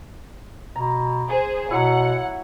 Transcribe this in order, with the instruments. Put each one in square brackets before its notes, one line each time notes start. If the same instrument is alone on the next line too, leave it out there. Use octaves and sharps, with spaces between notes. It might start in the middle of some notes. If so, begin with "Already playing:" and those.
[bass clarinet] B2 [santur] A#5
[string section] G#4 C5
[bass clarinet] B2 [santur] F#3 E4 [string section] F#5